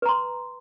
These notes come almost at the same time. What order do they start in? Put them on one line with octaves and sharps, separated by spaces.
B4 A#5 C6